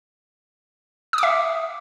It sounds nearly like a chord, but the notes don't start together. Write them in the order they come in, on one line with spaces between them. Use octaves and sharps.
D#6 D6 E5